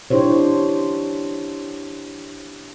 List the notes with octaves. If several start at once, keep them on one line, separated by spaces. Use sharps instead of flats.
D4 E4 G4 C5 C#5